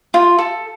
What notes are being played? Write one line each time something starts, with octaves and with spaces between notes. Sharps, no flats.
F4
A4